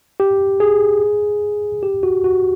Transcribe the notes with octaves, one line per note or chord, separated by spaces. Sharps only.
G4
G#4
G4
F#4
F#4